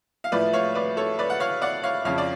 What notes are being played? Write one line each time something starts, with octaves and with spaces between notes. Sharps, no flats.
F5
A2 F3 A3 B4 D5
C#5 F5
B4 D5
A4 C#5
B4 D5
F#5
C#5 F5
D5 F#5
C#5 F5
F2 C#3 F3 C#5 F5
D5